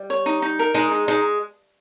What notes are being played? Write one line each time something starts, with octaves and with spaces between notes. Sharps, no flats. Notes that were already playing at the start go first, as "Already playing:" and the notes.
Already playing: G3
C#5
D#4
D#4
A#4
G#3 D#4
D#4
G#3 D#4